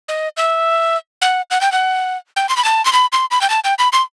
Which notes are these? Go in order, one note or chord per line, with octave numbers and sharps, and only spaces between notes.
D#5
E5
F#5
F#5
G5
F#5
G5
C6
B5
A5
C6
B5
C6
B5
G5
A5
G5
B5
C6